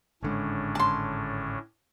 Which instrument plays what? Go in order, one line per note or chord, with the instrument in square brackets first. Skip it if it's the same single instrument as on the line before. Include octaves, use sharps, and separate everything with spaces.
[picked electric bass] G#1 D3 G#3 [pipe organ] A2 C#4 D4
[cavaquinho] A5 C6